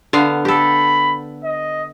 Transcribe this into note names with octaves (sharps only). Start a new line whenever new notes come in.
D3 B3 F5
G4 A4 B5
D#5